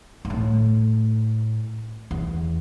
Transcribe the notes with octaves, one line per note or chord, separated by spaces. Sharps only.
G2
A2
E2